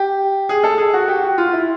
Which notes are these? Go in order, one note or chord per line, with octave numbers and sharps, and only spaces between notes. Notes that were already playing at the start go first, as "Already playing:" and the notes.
Already playing: G4
G#4
A4
G#4
F#4
G4
F#4
F4
E4